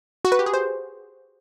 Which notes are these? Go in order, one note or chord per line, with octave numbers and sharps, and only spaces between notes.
F#4
B4
G4
G#4
C5